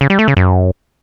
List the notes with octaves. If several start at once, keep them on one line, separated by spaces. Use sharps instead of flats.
C#3
G3
A3
C#3
F#2